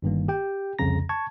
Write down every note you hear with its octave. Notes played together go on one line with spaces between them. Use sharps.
G1 G2 D#3 A#3
G4 G5
C2 F2 C#3 A#5 A#6
A5 C#6 G#6